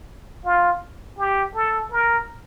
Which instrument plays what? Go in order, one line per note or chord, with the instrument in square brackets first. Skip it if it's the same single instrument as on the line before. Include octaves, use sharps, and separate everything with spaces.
[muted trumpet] F4
G4
A4
A#4